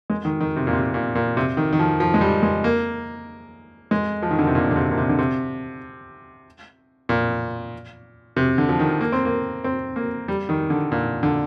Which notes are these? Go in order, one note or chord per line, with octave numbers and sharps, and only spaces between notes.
G#3
D#3
D#3
C3
A#2
C3
A#2
A#2
C3
D#3
D#3
F3
F3
G#3
G3
G#3
A#3
G#3
F3
D#3
D3
C3
A#2
D3
C3
A#2
C3
D3
C3
A#2
C3
D3
F3
D#3
A#3
C4
A#3
C4
A#3
G3
D#3
D3
A#2
D3